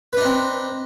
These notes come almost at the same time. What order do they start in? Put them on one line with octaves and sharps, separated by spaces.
B4 D4 D#4 C4